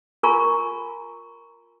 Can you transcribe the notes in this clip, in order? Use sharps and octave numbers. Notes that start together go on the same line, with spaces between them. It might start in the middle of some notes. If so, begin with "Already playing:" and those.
F4 A#4 G#5 A#5 C#6